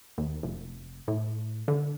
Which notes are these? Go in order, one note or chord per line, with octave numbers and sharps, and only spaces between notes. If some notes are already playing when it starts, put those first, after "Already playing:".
D#2
F1
A2
D3